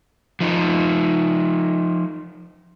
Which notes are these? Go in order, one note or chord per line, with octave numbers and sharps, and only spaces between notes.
F3 D#4